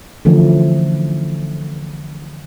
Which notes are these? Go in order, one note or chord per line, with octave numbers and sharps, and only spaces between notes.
D3 E3 F3 A3 C#4